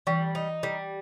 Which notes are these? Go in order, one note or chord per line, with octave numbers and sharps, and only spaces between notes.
E3 G3
D#4
G3